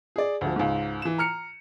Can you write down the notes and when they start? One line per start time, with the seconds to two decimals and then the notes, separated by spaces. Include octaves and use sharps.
0.16 G#4 D5
0.41 D2 F3
0.56 C#2 G#2
1.02 E3 E7
1.18 A#5 F6 C#7